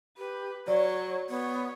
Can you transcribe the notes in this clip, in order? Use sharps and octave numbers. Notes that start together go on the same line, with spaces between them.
G4 B4
F#3 C#5 D5
B3 C#5